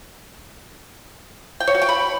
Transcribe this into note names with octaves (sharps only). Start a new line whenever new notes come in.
G5
C#5
F#4
G5
B5